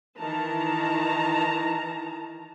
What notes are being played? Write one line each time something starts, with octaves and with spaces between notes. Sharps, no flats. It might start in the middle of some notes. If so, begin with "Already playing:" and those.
D#3 E3 A5 A#5